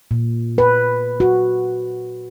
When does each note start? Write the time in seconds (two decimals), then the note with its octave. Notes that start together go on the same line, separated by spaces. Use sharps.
0.11 A#2
0.58 B4
1.20 F#4